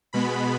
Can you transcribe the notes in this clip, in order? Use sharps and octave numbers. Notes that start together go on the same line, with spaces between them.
B2 G#3 B3 B5